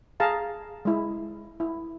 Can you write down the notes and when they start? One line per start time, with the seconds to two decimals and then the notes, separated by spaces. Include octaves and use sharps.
0.20 G#4 F5 A5 A#5
0.85 G#3 E4
1.60 E4